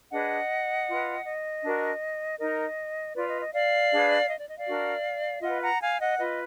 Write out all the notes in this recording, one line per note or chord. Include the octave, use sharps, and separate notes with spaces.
D4 G#4 B4 D#5 F#5
F4 B4
D#5
D4 F#4 A#4
D#4 A#4 D#5
F4 B4 D5
D#5
D#5
D5 F5
D4 G#4 B4
D#5
D5
D#5
D5 F5
D4 F#4 A#4
F4 B4 D#5 F#5
F#5 A#5
F5 G#5
D#5 F#5
F4 B4 D#5